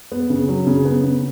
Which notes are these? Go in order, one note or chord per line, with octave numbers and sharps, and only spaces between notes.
B3
C#3
F#3
C#3
B3
C#3